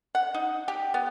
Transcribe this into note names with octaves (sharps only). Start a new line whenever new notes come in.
F#5
D#4
G4
B3